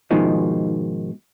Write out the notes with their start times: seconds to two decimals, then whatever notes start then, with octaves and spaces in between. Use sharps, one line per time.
0.11 G#2 B2 D#3 F3